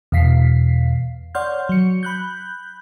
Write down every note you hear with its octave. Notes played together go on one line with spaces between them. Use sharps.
E2 B2 F5 B6 C7
C#5 D5 F#5 C6 F6 G6
F#3 C#7
B5 F#6 G6